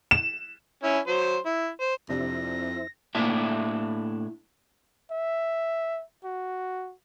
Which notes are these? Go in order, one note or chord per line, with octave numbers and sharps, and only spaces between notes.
E7
C#4 E4
F#3 C5 C6
E4
C5
F2 C3 F3 D4 E4 C5 E5 A#6
A2 A#3 D4 E4 E5
E5
F#4